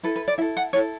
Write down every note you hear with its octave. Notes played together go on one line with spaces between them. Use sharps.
E4 A4 B4
B4
D5
E4 A4 E5
F#5
E4 A4 C#5